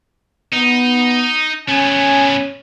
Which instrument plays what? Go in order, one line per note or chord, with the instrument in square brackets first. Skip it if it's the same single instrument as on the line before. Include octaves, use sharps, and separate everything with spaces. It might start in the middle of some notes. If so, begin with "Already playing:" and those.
[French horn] B3 [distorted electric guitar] D#4
[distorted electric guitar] A3 B3 [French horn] C#4 [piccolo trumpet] G#5